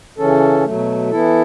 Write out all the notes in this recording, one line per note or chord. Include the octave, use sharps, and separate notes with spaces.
C#3 E3 C#4 A4
B2 F#3 A3
E3 B3 E4 A4